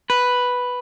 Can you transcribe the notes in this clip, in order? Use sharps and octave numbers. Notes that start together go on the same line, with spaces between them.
B4